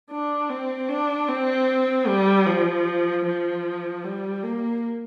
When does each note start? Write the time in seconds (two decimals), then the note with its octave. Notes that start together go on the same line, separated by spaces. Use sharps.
0.11 D4
0.49 C4
0.89 D4
1.29 C4
2.07 G3
2.46 F3
3.26 F3
4.04 G3
4.43 A#3